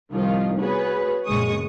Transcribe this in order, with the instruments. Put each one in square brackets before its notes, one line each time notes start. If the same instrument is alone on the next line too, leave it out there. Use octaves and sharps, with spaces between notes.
[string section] C2 D#3 F3 F4
B3 F#4 G#4 B4 C#5
A#1 F#2 C#3 G#3 C#6 D#6